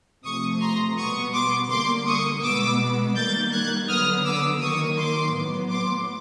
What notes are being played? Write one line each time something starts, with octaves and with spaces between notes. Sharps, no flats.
C3 F3 A3 C#6 D#6
A#5 C6
B2 G3 B3 C#6 D#6
C6 D6
D3 G3 A#3 C6 D6
C#6 D#6
B2 G#3 B3 D6 E6
D#3 G3 A#3 G6 A6
F#6 G#6
D3 F#3 B3 D#6 F6
D6 E6
D#3 F#3 A#3 C#6 D#6
C6 D6
A2 F#3 B3
C6 D6